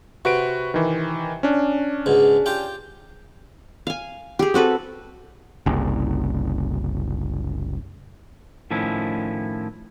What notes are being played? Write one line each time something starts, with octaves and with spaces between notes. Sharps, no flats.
C3 F#4 B4 D7
D#3 E3
C#4 D4
C#2 G#2 B2
F4 G4 G5
F5 G#5
G4 G#4
C4 F#4 A4 B4
F#1 C2
A2 D#3 F3 C#4 E4